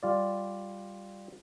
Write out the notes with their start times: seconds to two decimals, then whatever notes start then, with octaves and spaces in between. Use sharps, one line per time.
0.03 G3 F4 D5